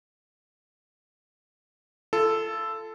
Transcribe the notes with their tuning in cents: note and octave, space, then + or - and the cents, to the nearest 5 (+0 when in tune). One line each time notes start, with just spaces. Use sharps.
F4 -35 A4 +0